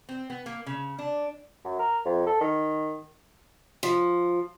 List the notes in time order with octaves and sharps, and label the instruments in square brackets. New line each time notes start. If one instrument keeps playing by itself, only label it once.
[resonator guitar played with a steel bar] C4
B3
A#3
C#3
D4
[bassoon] F#2
A#4
F2
A4
D#3
[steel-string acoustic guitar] F3